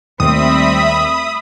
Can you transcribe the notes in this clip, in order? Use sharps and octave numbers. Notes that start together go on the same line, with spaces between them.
D#2 G3 A3 C4 E5 B5 D#6